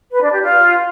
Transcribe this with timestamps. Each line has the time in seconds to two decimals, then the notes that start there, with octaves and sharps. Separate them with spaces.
0.12 B4
0.22 D4
0.32 G4
0.42 F4